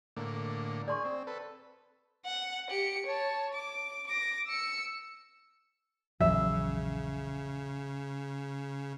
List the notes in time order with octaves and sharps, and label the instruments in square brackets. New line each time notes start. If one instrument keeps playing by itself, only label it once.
[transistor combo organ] A2 D3 A#3
[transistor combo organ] G#4 [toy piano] D5 C6 C#6
[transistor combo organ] C4
A4 B4
[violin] F#5
G4 C#7
C#5 A5
D6
D6 A#6
E6 C#7
[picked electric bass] A#1 E2 F#3 [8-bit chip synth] C#3 [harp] E5